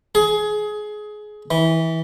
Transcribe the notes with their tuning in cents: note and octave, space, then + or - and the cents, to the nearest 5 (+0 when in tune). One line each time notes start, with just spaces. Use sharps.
G#4 +20
E3 -20